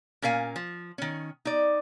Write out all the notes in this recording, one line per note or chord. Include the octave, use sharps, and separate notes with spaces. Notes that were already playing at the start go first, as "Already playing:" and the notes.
A#2 C#4 A#4 F5 G#5
F3
D#3 C#4
D#4 D5